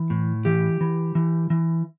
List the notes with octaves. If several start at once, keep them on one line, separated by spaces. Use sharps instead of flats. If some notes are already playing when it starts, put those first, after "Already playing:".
Already playing: E3
A2
E3 G4
E3
E3
E3